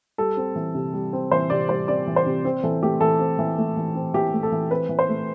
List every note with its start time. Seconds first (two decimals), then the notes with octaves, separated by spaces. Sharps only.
0.18 G3 A4
0.37 C4
0.56 E3
0.75 C3
0.93 G3
1.13 C4
1.31 E3 C5
1.50 C3 D5
1.69 G3 C5
1.88 C4 D5
2.07 E3
2.16 C5
2.26 C3
2.45 C4
2.63 E3 A4
2.82 A3 G4
3.01 E3 A4
3.19 C4
3.39 E3
3.58 A3
3.77 E3
3.95 C4
4.14 E3 G4
4.33 A3
4.43 A4
4.52 E3
4.70 C4 B4
4.89 E3
4.99 C5
5.09 A3